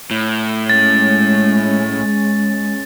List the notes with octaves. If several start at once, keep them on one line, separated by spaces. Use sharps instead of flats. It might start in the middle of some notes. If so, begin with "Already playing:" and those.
A2
G#3 C#4 A6